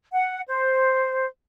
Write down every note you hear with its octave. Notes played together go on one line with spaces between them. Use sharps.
F#5
C5